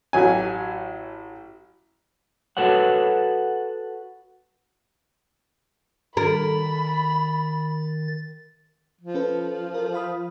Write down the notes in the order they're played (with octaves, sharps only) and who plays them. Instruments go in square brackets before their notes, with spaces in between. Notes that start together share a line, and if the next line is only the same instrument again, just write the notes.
[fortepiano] A1 F#3 G#5
[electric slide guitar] F#4 A4 B4 C#5 F#5
[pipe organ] D#3 A6 [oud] A#4 [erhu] B5
[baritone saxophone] F3
[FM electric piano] C#4 A4 B4
A4 A#4
F5 B5 D#6